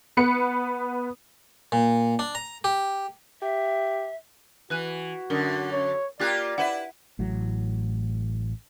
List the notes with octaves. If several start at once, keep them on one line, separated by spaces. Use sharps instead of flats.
B3 B4 C#7
A#2
D4
A#5
G4
G4 E5
E3 F#4 B4 F#6 D#7
F#2 D3 A#4
C#5
A#3 F4 G4 D5 F#6 A6
E4 B4 E5 F#5
A1 A2 F#3